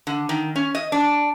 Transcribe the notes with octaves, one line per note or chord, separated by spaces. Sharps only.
D3
D#3
C#4
D#5
D4